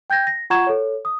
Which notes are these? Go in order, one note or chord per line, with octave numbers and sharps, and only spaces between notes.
G5 G6 G#6 A#6
A#6
F4 F#5 A#5 C#6 G#6 E7
A4 C#5
D#6